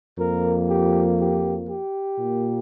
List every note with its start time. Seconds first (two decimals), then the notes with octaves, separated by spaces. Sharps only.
0.18 F2 F3 A#3 A#4
0.68 G4
1.18 G4
1.68 G4
2.19 A#2 A#3